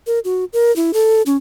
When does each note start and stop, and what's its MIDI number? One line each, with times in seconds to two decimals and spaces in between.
0.07 0.19 70
0.25 0.45 66
0.53 0.74 70
0.76 0.91 64
0.94 1.22 69
1.26 1.37 61